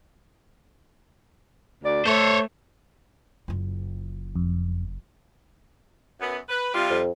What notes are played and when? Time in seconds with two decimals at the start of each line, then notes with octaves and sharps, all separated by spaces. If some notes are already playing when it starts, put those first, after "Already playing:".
1.83 D2 D5
2.06 A3 C5 C#5
3.48 F#1 F4
4.36 F2
6.20 F#2 B3
6.49 B4
6.74 C3 G3 F4
6.90 F2